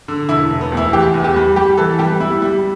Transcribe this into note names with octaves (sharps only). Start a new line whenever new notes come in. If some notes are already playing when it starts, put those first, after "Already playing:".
D3
E1 E4
E1
B3
D2
E4
E3 G4
E2
G4
G3
G3 G4
E3 A4
G3 G4
G3 E4
G3